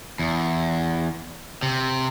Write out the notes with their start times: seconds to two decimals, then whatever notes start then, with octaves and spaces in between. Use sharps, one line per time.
0.19 E2
1.63 C3